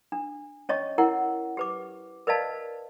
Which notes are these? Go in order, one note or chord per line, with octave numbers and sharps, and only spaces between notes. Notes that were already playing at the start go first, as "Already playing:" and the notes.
D4
C#4 C#5 D#5 C#6
E4 A#4 F#5
G4 B4 D6
A#4 B4 D5 D#5 F5 A5